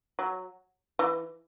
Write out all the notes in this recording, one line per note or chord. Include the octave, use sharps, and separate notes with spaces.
F#3
E3